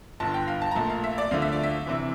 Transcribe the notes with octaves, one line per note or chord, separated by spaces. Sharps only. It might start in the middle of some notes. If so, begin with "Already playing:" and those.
G1 G2 D3 A5
G5
F5
A5
A#5
A#1 A#2 A3 A5
F5
E5
D5
D2 D3 F3 A3 F5
E5
D5
E5
C3 E3